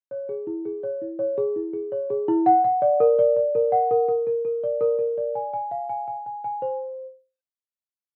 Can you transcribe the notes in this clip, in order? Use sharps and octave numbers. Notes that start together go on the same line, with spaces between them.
C#5
G#4
E4
G#4
C#5
E4
C#5
G#4
E4
G#4
C#5
G#4
E4
F#5
F#5
D5
A#4
D5
D5
A#4
F#5
A#4
A#4
A#4
A#4
D5
A#4
A#4
D5
G#5
G#5
F5
G#5
G#5
G#5
G#5
C5